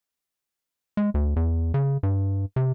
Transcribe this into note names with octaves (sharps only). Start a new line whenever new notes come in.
G#3
D2
E2
C#3
G2
C3